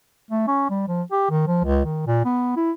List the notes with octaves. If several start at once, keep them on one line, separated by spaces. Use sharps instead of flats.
A3
C#4
G3
F3
G4
D#3
F3
C#2
D#3
A#2
B3
E4